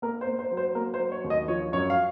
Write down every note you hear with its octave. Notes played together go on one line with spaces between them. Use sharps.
A#3 A#4
C5
A#3
C5
F#3
C5
A#3 A#4
C5
F#3
C#5
D#2
D#5
F3 C#5
F#2 C#5
F5